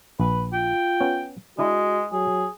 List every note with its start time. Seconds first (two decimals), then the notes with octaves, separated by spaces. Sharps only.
0.20 A#1 B4
0.53 F4 G5
1.00 B3 C#4 C#5
1.59 G#3 D4 E4 F#4 E5
2.12 F#3 G#4